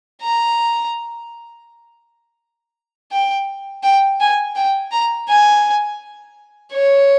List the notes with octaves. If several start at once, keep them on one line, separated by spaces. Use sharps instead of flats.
A#5
G5
G5
G#5
G5
A#5
G#5
C#5